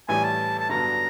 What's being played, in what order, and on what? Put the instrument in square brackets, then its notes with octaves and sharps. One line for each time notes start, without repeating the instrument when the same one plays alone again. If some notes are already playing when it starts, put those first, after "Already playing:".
[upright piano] A1 A2 E3 G3 [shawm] G#5
[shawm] A5
A5
[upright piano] G2 D3 F#3 B3 [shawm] A#5